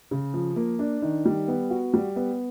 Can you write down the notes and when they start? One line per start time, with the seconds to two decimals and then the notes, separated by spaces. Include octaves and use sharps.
0.11 C#3
0.34 F3
0.56 A#3
0.79 D4
1.02 D#3
1.25 G3
1.48 B3
1.70 F#4
1.94 G3
2.16 B3